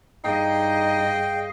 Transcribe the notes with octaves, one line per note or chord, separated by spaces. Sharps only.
G2 D#4 G#4 D#5 F5 G5